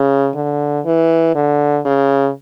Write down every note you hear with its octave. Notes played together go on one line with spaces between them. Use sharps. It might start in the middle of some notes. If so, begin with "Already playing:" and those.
Already playing: C#3
D3
E3
D3
C#3